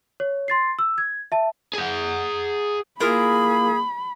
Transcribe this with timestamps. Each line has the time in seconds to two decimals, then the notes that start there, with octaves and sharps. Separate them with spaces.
0.20 C#5
0.48 C6 A6 C7
0.79 E6
0.98 G#6
1.32 E5 A5
1.73 G#4 F#5
3.00 A#3 E4 F4 G#4 A#4 B5